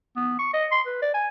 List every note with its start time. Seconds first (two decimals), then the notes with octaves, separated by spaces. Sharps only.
0.16 B3
0.39 C#6
0.54 D#5
0.72 C6
0.86 B4
1.02 D5
1.14 G#5